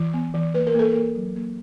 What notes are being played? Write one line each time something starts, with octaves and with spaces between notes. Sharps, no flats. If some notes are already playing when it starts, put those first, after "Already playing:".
Already playing: E3
B3
E3
A#3 B4
A#4
A#3 A4
A#3 A#4
F#3
A#3